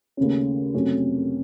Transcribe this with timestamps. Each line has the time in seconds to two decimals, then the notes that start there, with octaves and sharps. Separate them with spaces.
0.17 D#2 C#3 A3 C#4
0.74 F2 C3 F#3 A3 C#4